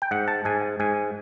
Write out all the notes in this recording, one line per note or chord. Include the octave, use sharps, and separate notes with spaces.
G5
G#2 F#5
A5
G#2 G#5
G#2 G#5